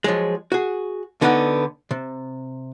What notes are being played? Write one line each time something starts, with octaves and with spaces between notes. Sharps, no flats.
F3 F#3 G#3
F#4 G#4
D2 D3 B3 D#4 E5 F#5
C3